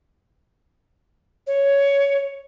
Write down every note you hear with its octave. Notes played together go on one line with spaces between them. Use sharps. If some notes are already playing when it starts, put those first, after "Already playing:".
C#5